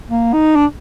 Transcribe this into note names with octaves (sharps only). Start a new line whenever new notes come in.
A#3
D#4
D4